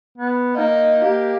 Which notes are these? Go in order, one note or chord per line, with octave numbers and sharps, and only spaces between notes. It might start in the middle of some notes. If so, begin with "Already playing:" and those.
B3
A#3 D#4
A#3 G4